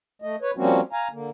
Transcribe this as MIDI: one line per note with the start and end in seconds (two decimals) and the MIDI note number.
0.22 0.36 57
0.22 0.36 75
0.42 0.51 71
0.42 0.51 73
0.57 0.81 53
0.57 0.81 55
0.57 0.81 58
0.57 0.81 60
0.57 0.81 61
0.57 0.81 66
0.93 1.08 77
0.93 1.08 80
0.93 1.08 82
1.11 1.30 50
1.11 1.30 58